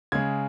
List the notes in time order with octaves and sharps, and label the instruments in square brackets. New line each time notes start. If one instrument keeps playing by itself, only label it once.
[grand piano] C#3 G#3 G#6